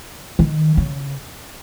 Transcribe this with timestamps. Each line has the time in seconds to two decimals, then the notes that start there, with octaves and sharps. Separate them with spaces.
0.39 D#3
0.77 C#3